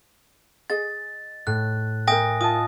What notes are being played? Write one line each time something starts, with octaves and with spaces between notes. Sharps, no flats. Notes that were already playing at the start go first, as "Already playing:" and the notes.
G#4 D#5 A6
A2 F#6
A#4 E5 G5 G#5 D#6 A#6
F4 D#5 A5 D#6